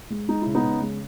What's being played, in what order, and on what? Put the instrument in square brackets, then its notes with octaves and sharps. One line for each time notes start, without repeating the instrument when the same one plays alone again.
[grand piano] G#3
G#3 D#4
C#3 E4
B3 D#4
C#3
G#3